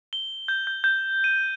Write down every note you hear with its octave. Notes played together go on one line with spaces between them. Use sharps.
G7
G6
G6
G6
D#7